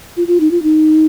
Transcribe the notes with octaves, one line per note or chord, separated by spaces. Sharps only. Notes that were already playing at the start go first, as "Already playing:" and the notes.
F4
F4
D#4
F4
D#4